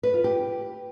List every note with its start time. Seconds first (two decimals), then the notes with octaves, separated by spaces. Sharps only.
0.03 B4
0.14 F4
0.24 G4